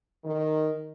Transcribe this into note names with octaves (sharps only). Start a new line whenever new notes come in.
D#3